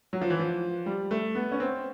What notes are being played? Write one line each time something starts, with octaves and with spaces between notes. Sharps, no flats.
F#3
F3
E3
F3
G3
A3
B3
C#4
C4